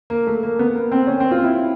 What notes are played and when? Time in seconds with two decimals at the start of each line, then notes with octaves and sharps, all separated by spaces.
0.10 A#3
0.27 A3
0.43 A#3
0.59 B3
0.75 A#3
0.92 C4
1.07 C#4
1.20 C4
1.31 F4
1.44 E4